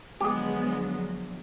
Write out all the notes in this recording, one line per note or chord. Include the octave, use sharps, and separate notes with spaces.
D3 F3 F#3 G#3 B3 G4 G#4